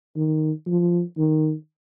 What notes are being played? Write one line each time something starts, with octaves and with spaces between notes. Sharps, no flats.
D#3
F3
D#3